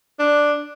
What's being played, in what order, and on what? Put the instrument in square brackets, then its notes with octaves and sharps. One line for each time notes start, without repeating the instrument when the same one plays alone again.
[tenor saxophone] D4